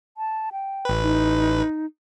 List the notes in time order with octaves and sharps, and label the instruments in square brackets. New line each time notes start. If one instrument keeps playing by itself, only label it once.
[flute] A5
G5
[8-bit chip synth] A1 B4
[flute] D#4